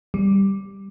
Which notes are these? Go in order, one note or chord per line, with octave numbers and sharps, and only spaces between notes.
G3